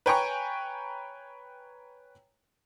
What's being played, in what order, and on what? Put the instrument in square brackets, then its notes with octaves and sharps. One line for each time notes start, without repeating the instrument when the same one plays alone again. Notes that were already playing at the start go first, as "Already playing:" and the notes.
[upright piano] B4 C#5 G5 G#5 A#5 C#6